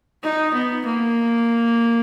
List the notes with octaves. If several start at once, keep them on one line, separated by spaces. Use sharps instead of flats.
D#4
B3
A#3